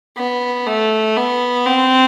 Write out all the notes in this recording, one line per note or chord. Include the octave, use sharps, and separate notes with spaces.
B3
A3
B3
C4